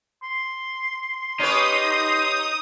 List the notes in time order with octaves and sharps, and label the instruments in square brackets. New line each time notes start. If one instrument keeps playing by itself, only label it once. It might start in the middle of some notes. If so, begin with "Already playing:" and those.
[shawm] C6
[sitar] C#4 G4 B4 [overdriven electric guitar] D#4 [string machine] D#6